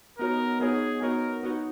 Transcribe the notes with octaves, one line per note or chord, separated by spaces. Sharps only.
B3 D#4 F#4 A#4 C#5
B3 D#4 F#4 G#4 C#5
B3 D#4 F#4 A#4 C#5
B3 D#4 F#4 C#5